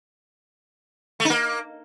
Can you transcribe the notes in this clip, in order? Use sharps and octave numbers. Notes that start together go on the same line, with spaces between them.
A3
D#4
A#3